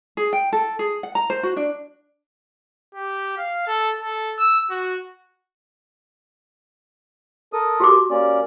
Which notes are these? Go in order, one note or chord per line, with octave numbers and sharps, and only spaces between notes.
G#4
G5
A4
G#4
F#5
A#5
C5
F#4
D4
G4
F5
A4
A4
E6
F#4
A4 A#4 D#6
F#4 G4 D6
A#3 C#4 D5